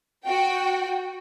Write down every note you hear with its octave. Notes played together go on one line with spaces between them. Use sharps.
F#4 G5